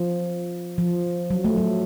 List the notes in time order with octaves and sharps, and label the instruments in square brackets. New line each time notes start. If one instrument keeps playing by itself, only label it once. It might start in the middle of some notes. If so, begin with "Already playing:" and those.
Already playing: [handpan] F3
F3
F#3
A3
F#3